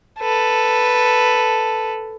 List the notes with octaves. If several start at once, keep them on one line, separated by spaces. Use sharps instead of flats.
A4 B4